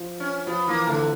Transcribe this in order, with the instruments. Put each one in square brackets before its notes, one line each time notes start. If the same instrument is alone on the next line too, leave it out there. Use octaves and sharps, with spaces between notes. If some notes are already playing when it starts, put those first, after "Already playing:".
Already playing: [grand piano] F3
[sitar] C#4
[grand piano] F3 [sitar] B3
[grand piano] E3 [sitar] A#3
[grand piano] D3 [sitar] A3